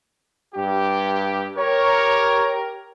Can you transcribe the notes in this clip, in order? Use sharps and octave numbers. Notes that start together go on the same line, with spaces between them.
G2 G4
G4 A#4 C#5